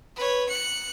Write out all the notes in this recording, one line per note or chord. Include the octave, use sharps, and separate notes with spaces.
B4 C#5
F#6 C#7